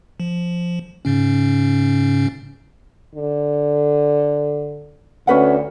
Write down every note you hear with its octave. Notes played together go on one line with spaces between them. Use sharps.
F3
G#2 C#3 C#4
D3
D2 C#4 B4 F#5